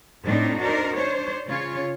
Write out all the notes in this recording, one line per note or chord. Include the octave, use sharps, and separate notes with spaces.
A2 C4 D4 D#4 A4
D4 D#4 F#4 A#4 C5
D4 C5 C#5
C#3 F4 C#5